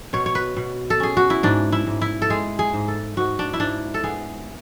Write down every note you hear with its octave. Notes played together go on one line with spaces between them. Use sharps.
B2 C#5
C#5
B4
B2
A4
C#4 G#4
F#4
E4
G#2 D4
E4
G#2
E4
A4
G#3 G#4
G#4
G#2
A4
G#2 F#4
D4
E4
G#2 D4
A4
B3 G#4